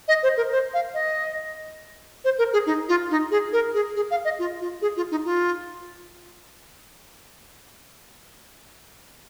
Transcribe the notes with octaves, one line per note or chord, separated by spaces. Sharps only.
D#5
C5
A#4
C5
F5
D#5
C5
A#4
G#4
D#4
F4
D#4
G#4
A#4
G#4
G#4
F5
D#5
F4
F4
G#4
F4
D#4
F4